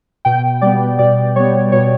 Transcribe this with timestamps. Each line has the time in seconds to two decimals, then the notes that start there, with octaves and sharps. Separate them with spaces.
0.25 B2 G5
0.61 G3 B3 D5
0.99 B2 D5
1.36 G3 B3 C#5
1.72 B2 C#5